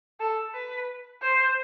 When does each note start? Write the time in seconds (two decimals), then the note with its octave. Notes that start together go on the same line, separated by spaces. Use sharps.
0.20 A4
0.54 B4
1.22 C5